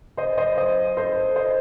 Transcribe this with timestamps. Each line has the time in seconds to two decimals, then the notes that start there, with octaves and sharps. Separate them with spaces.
0.17 C5 D#5
0.37 C5 D#5
0.57 C5 D#5
0.97 A4 C5
1.36 C5 D#5